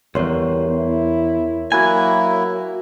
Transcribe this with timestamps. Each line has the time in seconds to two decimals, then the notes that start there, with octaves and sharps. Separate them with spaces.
0.15 B1 E2 G3 A#4 C#5 C6
0.68 E4
1.72 F#3 A#3 E4 F#4 G#5